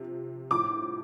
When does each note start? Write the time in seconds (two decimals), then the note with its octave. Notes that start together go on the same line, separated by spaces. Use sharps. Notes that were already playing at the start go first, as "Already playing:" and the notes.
Already playing: C3 F3
0.51 A2 F3 D6